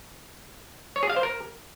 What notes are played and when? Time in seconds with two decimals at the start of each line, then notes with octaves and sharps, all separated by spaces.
0.96 C#5
1.03 G#4
1.10 F5
1.16 C5
1.23 A#4